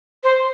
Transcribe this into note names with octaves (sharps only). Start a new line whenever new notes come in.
C5